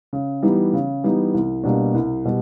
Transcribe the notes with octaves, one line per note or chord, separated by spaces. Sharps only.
C#3
E3 G3 B3 D#4
C#3
E3 G3 B3 D#4
C2
B2 G3 A#3 D4
C2
B2 G3